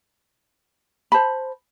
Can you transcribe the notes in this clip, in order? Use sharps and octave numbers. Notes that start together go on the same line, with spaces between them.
C5 A5 B5